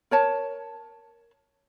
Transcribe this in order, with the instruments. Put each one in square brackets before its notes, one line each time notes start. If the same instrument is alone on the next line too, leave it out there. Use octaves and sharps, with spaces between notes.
[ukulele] A#4 C#5 A5